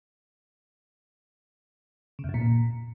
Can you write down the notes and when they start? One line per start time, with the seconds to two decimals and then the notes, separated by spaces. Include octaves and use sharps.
2.19 C#3
2.24 E2
2.29 F#2
2.34 A#2